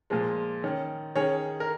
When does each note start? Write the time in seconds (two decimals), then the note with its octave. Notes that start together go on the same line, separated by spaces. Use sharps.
0.10 A#2 F3 G#3
0.64 D#3 C#4
1.16 D#3 C#4 G#4 C#5
1.60 A#4